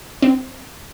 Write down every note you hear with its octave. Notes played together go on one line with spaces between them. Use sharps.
C4